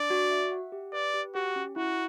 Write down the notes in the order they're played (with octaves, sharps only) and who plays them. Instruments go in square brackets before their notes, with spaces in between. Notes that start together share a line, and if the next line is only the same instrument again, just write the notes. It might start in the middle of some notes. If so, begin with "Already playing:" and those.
Already playing: [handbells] D4 [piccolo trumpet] D5
[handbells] F#4
E5
F#5
G4
[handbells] B4 [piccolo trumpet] D5
[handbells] G4
[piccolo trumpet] F#4 [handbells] G4
[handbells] C#4
[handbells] E4 [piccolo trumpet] F#4